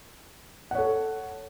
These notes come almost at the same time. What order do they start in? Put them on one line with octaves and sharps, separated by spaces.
F#5 C#5 A4